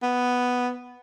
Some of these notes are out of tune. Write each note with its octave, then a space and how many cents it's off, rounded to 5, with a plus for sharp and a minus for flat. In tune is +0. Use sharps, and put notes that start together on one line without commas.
B3 +0